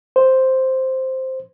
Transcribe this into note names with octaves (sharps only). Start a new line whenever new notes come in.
C5